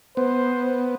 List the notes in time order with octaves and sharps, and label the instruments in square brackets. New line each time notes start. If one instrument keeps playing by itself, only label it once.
[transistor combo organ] B3 [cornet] C5